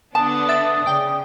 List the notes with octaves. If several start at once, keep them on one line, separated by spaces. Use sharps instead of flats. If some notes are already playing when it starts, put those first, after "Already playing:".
D3 B3 D4 A5 D#6
E5 A6
C#3 D5 G5